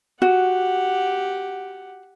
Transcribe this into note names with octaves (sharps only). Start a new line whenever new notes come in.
F#4 G4 F#5